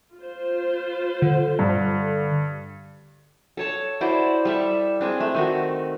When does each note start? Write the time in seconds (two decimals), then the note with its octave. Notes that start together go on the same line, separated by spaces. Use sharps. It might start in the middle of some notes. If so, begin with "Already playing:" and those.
0.16 F4 C5
1.22 D3
1.59 G2
3.57 A4 C#5 A5
4.01 E4 F#4 C5 D5
4.45 G3 A4 E5
5.01 G#3 C4 D4
5.20 A3
5.35 D#3 A3 F#4